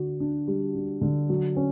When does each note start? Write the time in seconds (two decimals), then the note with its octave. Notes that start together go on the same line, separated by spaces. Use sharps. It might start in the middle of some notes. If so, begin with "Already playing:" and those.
Already playing: D3 F#4
0.20 D4
0.48 G3
0.75 D4
1.01 D3
1.29 F#3
1.56 C#4